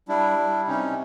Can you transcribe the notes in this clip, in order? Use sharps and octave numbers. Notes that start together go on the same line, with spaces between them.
G3 D4 E4
G3
C3 C#4 D#4